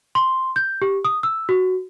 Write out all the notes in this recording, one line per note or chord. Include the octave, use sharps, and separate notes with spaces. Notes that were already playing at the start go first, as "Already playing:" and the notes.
C6
G6
G4
D#6
E6
F#4